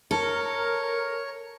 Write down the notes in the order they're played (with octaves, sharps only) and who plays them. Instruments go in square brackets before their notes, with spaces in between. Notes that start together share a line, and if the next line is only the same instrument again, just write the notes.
[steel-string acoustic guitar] A4 [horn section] A#4 [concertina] C#5